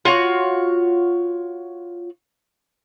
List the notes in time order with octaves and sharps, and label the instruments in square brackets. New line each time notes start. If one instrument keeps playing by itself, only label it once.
[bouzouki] F4 F#4 C#5